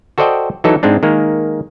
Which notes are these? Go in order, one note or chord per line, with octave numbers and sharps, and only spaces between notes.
F#4 A4 C5 D5 D#5 G5
E3 F#3 D#4 A4
G#2 G#3 C4 D4
D#3 G#3 A#3